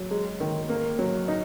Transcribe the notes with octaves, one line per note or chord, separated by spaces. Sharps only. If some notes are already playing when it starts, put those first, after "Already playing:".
Already playing: F#3
G#3
D#3
A#3
F#3
D#4